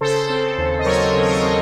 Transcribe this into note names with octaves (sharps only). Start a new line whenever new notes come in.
C#3 A4 C5
C4
D#2
D#5
F#3 A#4 C#5
C#3
C#5
C5 D#5
C4